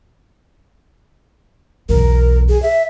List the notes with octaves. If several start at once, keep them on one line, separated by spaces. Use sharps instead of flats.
B1 E2 A#4
G#4
E5